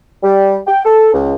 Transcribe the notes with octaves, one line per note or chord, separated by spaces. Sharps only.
G3
G5
A4
C#2